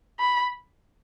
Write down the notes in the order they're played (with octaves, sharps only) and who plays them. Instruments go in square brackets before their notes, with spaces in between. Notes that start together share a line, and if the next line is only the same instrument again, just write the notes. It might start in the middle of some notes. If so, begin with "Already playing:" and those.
[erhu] B5